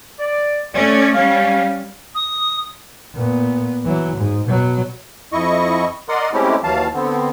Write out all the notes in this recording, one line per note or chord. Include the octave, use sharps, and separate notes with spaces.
D5
A3 C#4 D5
G3 C#4 F5
D#6
A#2 B3
E3 F#3
G#2
B2 F#3
F2 E4 D#5 C#6
A#4 D5 D#5 F#5 C6
G#3 A3 C4 C#4 E4 G4
D#2 E3 F#3 F5 A5
D3 B3 C4